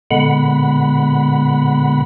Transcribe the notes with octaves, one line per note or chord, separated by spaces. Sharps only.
A#2 D3 G#3 B3 F#5 B5